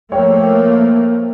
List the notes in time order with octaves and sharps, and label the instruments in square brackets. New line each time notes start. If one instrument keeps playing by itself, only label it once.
[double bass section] F3 A3 A#3 [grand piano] C#5 G5